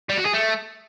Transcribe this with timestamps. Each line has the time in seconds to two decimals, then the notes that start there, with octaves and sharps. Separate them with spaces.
0.09 G3
0.17 F#4
0.25 G#4
0.33 A3